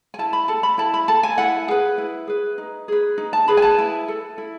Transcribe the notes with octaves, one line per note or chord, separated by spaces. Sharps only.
G#5
E4 A5
B5
A4 A5
B5
E4 A5
B5
A4 A5
G#5
E4 F#5
G#4 B4
E4
G#4 B4
D#4
G#4 B4
D#4
A5
G#4 B4 B5
G#5
A5
E4
A4
E4